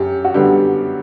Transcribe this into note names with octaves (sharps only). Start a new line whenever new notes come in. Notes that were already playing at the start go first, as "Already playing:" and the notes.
Already playing: F#2 G4
F#4
D3 G3 B3 G4